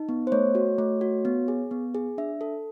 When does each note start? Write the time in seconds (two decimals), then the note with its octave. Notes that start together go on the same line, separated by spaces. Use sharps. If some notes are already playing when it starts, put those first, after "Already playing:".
Already playing: D#4
0.09 B3
0.27 C5
0.32 A3 C#5
0.55 F#4
0.78 A3
1.01 F#4
1.25 B3
1.48 G#4
1.71 B3
1.95 G#4
2.18 D4 E5
2.41 A4